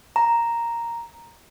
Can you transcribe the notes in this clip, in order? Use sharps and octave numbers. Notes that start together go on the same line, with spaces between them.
A#5